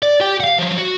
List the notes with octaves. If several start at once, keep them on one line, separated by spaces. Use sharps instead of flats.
D5
G4 G5
F5 F#5
F3 F#3
F#4